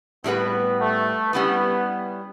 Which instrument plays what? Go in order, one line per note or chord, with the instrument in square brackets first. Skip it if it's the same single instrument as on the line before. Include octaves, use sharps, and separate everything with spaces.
[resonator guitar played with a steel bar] A2 G3 D4 F#4 B4 [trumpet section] B3
[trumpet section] A3
[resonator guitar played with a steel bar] G3 C#4 E4 B4 [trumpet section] B3